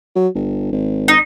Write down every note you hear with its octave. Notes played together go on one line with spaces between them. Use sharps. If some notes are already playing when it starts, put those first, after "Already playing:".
F#3
G1
G#1
D#4